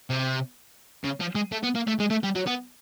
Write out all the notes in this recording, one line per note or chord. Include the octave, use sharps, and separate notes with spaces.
C3
C#3
F3
G#3
A3
B3
A#3
A3
G#3
A3
G3
F#3
B3